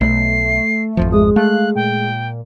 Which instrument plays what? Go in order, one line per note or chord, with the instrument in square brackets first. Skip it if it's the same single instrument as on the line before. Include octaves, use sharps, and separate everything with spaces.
[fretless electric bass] B1 [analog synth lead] A3 [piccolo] C7
[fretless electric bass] G#1 F2 F3
[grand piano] G#3 [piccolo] D#6
[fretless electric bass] A3 [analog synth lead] F5 [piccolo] F#6
[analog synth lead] A#2 [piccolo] G5